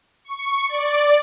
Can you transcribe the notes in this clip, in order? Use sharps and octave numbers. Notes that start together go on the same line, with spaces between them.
C#6
D5